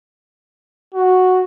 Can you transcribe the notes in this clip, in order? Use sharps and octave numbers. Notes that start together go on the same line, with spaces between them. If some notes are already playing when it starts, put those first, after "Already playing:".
F#4